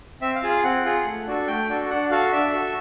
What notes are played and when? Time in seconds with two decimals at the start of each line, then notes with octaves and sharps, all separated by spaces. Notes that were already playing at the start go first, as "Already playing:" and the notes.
0.21 C4 E5
0.35 F5
0.42 F4 G#4
0.50 F5
0.64 C4 F#5
0.85 F4 G#4
1.06 A3
1.27 D4 F#4 A4
1.48 A3 G5
1.69 D4 F#4 A4
1.90 D4 F#5
2.11 F#4 A4 F5
2.32 D4 E5
2.53 F#4 A4